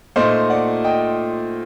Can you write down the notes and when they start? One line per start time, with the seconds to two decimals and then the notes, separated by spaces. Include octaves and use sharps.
0.16 A#2 A3 D#4 C5 D#5
0.50 D5 F#5
0.85 D#5 G5